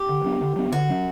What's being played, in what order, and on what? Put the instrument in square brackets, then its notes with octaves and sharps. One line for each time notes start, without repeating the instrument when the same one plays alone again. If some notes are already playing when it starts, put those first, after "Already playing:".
Already playing: [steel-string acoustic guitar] G4
[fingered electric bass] D3
F#3 B3 D4
D3
F#3 B3 D4
[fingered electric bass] D3 [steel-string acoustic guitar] F#4
[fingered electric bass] F#3 C#4